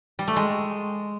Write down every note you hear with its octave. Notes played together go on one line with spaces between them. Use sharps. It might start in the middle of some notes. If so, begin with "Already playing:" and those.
G3
A3
G#3